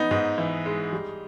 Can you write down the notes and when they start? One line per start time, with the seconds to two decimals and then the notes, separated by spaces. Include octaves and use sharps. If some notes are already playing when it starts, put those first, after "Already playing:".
Already playing: B3 D#4
0.11 G#2
0.38 E3
0.66 G#3
0.93 G3